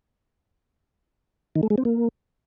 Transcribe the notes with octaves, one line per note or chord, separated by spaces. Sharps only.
D#3
A3
G#3
C4
A#3